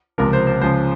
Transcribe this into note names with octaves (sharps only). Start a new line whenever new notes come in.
C#2 C3 F3 A#4
C5
C5
C#2 C#3 F3 C5